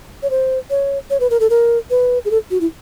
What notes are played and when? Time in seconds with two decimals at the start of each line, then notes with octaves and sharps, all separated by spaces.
0.23 C#5
0.30 C5
0.70 C#5
1.10 C#5
1.20 B4
1.30 A#4
1.40 A4
1.50 A#4
1.90 B4
2.25 G#4
2.31 A4
2.51 F#4
2.61 E4